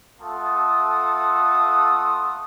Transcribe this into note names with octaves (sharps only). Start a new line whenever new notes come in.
A3 F4 A4 F#5 A5 D#6